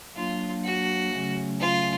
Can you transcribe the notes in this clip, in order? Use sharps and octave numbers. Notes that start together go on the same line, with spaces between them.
F#3 A#3 D4 F4
F#4
C#3 F#3 A3 C#4
F4